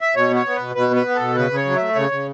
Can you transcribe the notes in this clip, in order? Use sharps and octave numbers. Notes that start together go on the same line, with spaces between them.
E5
B2 C#5
B3 C#5
B3
B2 B4
B2 B4
B3
B4
B3
A4
B2
C#3 B4
C#3 C#5
F#3
E5
A3
C#3 C#5
C#3